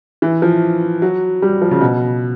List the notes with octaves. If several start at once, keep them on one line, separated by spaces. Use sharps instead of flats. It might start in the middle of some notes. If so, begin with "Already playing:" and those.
E3
F3
F#3
G3
F3
C#3
B2